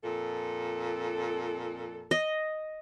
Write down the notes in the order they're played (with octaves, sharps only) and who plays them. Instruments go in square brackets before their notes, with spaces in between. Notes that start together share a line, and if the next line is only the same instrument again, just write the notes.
[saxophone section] F2 A#2 A4
[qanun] D#5